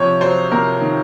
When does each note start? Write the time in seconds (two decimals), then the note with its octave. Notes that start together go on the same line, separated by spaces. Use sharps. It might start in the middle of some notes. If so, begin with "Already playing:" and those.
Already playing: C3 F3 C#5
0.21 F#3 C5
0.51 C3 A#4
0.81 D#3